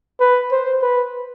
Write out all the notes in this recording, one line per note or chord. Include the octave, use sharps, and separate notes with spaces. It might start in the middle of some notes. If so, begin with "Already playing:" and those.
B4
C5
B4